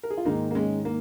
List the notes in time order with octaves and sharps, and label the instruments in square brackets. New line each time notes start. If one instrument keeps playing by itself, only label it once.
[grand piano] A#4
G#4
F4
G#2 D#3 G#3 A#3 D#4
A#3
G#3 C#4
A#3